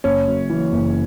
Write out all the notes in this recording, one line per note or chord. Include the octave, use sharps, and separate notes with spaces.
F#1 C#4
F#2
E3
F#1